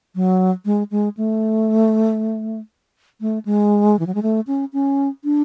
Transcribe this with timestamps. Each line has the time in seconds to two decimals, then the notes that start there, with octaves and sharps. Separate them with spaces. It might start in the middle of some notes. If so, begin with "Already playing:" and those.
0.15 F#3
0.65 G#3
0.91 G#3
1.17 A3
3.21 A3
3.45 G#3
3.99 E3
4.07 F#3
4.15 G#3
4.23 A3
4.47 C#4
4.73 C#4
5.24 D4